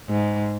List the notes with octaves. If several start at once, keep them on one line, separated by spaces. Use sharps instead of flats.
G#2